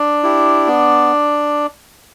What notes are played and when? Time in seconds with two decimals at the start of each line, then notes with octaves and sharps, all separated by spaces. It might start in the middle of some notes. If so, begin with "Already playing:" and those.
Already playing: D4 D5
0.23 E4 G4
0.68 B3